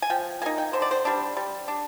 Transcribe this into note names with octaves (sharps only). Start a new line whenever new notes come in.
G#5
F3 G5
A#3 D#4 G#5
G5
D3 C5
D5
C5
G3 D4
G3
D4